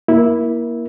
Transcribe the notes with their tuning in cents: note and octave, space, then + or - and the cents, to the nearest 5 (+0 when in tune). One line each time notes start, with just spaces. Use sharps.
A#3 +20 E4 -10